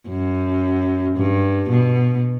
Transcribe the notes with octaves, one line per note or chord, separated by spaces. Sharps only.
F#2
G2
B2